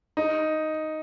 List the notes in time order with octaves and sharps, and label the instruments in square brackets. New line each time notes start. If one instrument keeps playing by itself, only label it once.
[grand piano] D#4